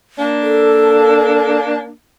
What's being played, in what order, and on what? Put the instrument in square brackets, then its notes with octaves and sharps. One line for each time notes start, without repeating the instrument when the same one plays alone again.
[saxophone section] A#3 D4
[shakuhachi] A4